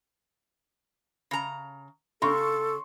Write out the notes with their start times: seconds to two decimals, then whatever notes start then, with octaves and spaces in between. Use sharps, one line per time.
1.31 C#3 A#5
2.22 C#3 A4 C6 C#6